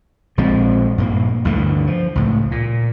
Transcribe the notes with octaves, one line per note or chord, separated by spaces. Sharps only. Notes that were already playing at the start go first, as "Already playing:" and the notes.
A#1 F3 G#3 C4
G2 A#2 A#3
D2 G2 D3 E3
F3
C#2 A2
A#2